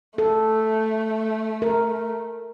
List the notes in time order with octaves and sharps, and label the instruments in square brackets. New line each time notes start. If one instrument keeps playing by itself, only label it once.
[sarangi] A3 [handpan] A4
[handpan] A#4